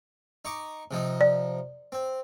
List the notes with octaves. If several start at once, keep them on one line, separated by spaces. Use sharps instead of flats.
D#4 C#6 D6
C3 F3 D#4
D5
C4